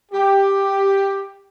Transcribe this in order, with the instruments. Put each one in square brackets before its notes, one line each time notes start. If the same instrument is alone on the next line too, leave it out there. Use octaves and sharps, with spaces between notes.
[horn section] G4